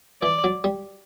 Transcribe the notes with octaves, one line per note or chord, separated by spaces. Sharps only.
E3 D5
F#3
G3